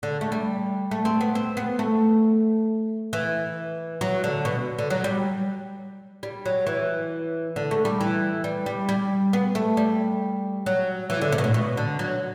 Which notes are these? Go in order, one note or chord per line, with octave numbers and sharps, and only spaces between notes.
D3
A3
G3
A3
C4
B3
C4
B3
A3
E3
F#3
D3
B2
D3
F#3
G3
G3
F#3
E3
D3
A3
G3
E3
G3
G3
G3
B3
A3
G3
F#3
E3
D3
C3
B2
A2
B2
D3
F#3